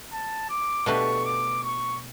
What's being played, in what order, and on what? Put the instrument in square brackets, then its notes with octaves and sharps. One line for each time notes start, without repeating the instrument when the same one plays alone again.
[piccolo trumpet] A5
D6
[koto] B2 A3 D4 G4 B4 [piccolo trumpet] C#6
[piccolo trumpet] D6
C#6